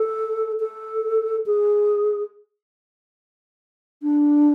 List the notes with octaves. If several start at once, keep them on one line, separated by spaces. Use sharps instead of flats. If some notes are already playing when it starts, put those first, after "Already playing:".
Already playing: A4
A4
G#4
D4